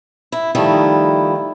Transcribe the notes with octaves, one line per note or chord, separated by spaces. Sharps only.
E4
D#3 F3 G3 A3 D#4 E4